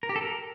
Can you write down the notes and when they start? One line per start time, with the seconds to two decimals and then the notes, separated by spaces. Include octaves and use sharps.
0.03 A#4
0.09 G4
0.16 A4
0.22 A#4